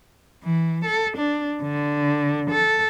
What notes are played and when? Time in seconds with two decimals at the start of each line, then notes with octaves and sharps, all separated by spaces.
0.44 E3
0.85 A4
1.18 D4
1.63 D3
2.51 A4